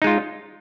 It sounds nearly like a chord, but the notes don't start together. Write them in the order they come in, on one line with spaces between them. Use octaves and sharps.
D#4 G#3 F4